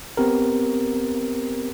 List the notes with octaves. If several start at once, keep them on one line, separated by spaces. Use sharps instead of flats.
B3 C4 G4 A#4